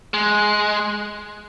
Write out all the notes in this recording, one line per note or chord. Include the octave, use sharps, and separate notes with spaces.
G#3